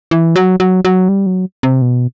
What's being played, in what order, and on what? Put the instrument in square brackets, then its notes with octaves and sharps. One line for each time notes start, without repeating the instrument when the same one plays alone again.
[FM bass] E3
F#3
F#3
F#3
G3
F#3
C3
B2